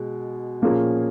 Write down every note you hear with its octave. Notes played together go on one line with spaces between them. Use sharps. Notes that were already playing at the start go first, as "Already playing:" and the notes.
Already playing: B2 G#3
A#2 F3 A#3 C#4 G#4